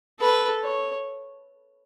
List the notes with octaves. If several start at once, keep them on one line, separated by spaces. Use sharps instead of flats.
A4 B4
C#5